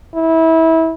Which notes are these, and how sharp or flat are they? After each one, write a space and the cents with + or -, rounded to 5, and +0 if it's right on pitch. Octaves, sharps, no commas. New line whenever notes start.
E4 -25